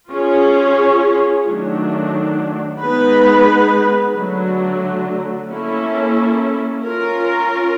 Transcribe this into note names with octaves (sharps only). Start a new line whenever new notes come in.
C#4 F4 G#4 C#5
D#3 F#3 A3 D4
G#3 B3 D#4 G#4 B4
D3 F#3 A3
A#3 C#4 E4 A4
C#4 F4 A#4